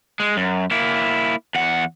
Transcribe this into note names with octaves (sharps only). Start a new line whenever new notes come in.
G#3
F#2
A#3 E4
E2 F#5